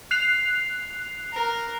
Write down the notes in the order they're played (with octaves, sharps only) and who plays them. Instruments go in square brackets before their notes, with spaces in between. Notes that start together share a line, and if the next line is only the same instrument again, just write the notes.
[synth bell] F#6 C7 F7
[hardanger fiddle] A#4